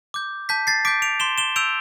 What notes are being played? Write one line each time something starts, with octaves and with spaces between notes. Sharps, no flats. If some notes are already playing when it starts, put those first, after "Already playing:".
D6 G6
A5 G6 B6
A6 C7
D6 G6 B6 D7
D7 F7
C6 E7 G7
E7 G7
E6 G6 D7 F7